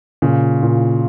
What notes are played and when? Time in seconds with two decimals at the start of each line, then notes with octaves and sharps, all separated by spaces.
0.22 A#2 C#3
0.63 A#2